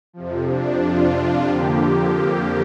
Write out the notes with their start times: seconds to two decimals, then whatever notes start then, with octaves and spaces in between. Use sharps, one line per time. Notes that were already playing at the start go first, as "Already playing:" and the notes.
0.13 F2 C3 F3
0.47 D4
0.82 F4
1.48 F2 D3 F3 A#3 G4